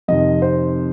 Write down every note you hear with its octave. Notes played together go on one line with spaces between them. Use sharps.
F2 C3 D#3 D#5
C5